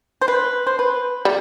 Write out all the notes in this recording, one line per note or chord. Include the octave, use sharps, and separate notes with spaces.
C5
B4
C5
B4
G3